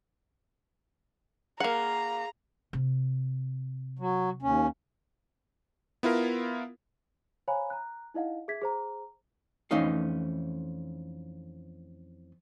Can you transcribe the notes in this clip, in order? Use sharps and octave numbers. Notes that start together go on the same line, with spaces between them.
A#3 G#4 F5 F#5 A#5
C3
F#3
D#2 C#4
B3 E4 F4 A#4
C5 C#5 F5 G#5 A#5 B5
A#5 F#6
D#4 E4 D#5 F5 F#5
G#4 E5 G#6 B6
G#4 C5 A#5
F2 E3 A3 C#4 D#4 F5